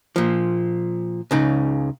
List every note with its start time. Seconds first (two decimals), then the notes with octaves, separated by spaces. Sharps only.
0.16 A#2 F3
1.31 C#2 C#3 D#4